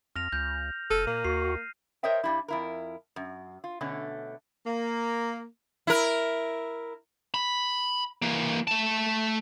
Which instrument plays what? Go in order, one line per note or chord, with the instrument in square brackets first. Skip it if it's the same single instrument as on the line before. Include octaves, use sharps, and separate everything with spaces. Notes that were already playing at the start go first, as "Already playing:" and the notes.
[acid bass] F2 [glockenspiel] F6 A#6 F7
[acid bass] C#2 [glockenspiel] G6
[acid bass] F1 [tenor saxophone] A4 [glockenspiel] F6 D#7
[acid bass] A#2 [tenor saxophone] A#3
[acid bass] D#2 [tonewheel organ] F#4 C#6 [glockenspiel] C7
[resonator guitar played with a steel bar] A#4 C5 C#5 D#5 E5 G5
G2 G3 E4
F2 E4 A#4
F#2
F4
B2 D3 A3 C#4
[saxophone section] A#3
[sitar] E4 A#4
[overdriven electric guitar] B5
E3 A#3
A3 A5